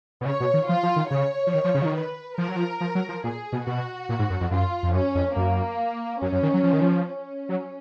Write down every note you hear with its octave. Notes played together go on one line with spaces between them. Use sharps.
B2
C#3 C#5
B2
D#3
F3 F4
F3
D#3
C#3 C#5
F3
D#3
F3
C#3
F3
D#3
B4
F3 A#4
F#3
F3
F3
F#3
F3
A#2 G#4
B2
B2 F#4
A#2
G#2
F#2
F2
F#2 F4
F2
F#2 C#4
F2
F#2 A#3
F#2 C#4
F#2
D#3
F#3
F3
D#3
F3
C#4
F#3